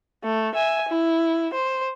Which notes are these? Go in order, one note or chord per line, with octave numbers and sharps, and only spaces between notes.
A3
E5 G#5
E4
C5